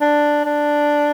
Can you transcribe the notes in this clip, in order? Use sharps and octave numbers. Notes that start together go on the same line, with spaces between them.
D4
D4